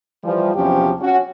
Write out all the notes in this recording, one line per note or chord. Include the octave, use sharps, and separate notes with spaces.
E3 F3 G3
E2 C3 F3 F#3 C#4 G4
C#4 F#4